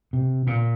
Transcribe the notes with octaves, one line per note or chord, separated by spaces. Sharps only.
C3
A#2